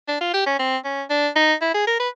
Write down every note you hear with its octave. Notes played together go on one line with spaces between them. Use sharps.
D4
F4
G4
C#4
C4
C#4
D4
D#4
E4
G#4
A#4
B4